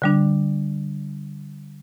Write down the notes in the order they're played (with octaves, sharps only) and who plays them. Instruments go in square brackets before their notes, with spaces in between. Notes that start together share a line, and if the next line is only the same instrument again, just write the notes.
[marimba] D3 G3 D4